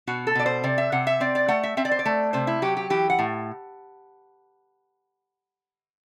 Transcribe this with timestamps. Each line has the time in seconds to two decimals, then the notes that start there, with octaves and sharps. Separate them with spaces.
0.07 B2 F#4
0.27 A4
0.35 B2 D5
0.46 C5
0.64 C3 D5
0.78 E5
0.92 C3 F#5
1.07 E5
1.20 C4 D5
1.35 D5
1.48 A3 F#5
1.63 E5
1.77 C4 E5
1.85 D5
1.91 C5
1.99 D5
2.06 A3
2.33 C3 C5
2.47 E4
2.62 F#3 G4
2.77 G4
2.90 E3 G4
3.10 F#5
3.19 A2